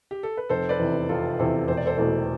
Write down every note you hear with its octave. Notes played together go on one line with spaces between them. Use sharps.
G4
A4
B4
F1 A4 C5
B4 D5
E2 C3
F1 F4 A4
E2 C3 A4 C5
E1 C5
D5
A4 C5
E2 B2 A3 A4 C5